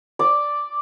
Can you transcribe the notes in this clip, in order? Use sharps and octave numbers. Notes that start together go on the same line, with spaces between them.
D5